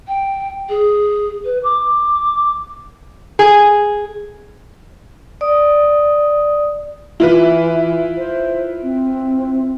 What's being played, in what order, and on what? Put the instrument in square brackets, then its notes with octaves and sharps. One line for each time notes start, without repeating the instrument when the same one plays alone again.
[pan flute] G5
G#4
B4
D6
[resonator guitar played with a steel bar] G#4
[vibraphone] D5 D#6
[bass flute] E3 [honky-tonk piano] E4 F4 B4
[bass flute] C5
C4